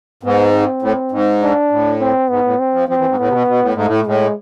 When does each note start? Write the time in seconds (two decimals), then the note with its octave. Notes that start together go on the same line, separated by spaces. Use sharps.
0.23 G#2 B3
0.53 C4
0.82 A2
1.12 G#2
1.41 D4
1.71 A2
2.00 C4
2.30 G#2 B3
2.44 A2
2.59 C4
2.74 F3
2.88 F3 C4
2.99 E3
3.09 G#2
3.18 A2 B3
3.28 C3
3.32 B2
3.48 B2
3.61 A2
3.73 G#2 A3
3.86 A2
4.06 A2 G#3